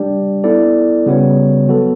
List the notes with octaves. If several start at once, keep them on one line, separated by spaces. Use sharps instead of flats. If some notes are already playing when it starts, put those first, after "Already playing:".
Already playing: G3 D4 G4 D5
B3 E4 A4 D5
C#3 G3 B3 F#4 C#5
F#3 B3 F#4 A4